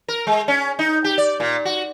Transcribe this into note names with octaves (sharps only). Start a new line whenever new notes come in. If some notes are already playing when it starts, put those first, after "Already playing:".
A#4
G#3
C#4
D#4
G4
D5
A#2
F#4